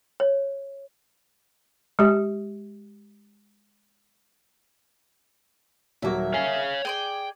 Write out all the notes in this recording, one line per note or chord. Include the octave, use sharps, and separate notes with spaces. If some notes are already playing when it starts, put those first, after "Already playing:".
C#5
G#3 G4
D#1 F#3 A#3 F#4 E5
C#5 F5 G#5
G#4 C5 D5 G5